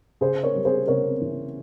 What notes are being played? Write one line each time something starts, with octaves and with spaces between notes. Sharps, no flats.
C#3 G#4 C5
A#4 C#5
G3
G#4 C5
C#3 A#4 C#5
E3